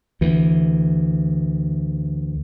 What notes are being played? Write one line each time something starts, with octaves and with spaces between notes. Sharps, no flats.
D2 E3